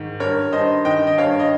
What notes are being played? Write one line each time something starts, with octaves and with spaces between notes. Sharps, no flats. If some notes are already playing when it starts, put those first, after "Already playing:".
Already playing: G#2 D#3
G2 A#4 C#5
G2 C5 D#5
D#3 D#5 G5
D#5
G2 C#5 F5
D#5